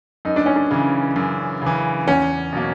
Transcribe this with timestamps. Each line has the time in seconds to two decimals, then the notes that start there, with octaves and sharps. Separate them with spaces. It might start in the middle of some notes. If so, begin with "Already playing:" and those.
0.25 F#2 D#4
0.36 D4
0.46 C#4
0.56 D4
0.71 C#3 E3
1.16 F#2
1.62 C#3 E3
2.07 E2 C#4
2.53 B2 F#3 A#3